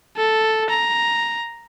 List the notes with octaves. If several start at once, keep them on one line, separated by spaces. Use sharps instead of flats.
A4
A#5